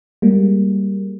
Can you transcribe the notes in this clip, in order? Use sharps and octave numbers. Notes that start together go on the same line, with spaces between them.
G3 G#3 A#3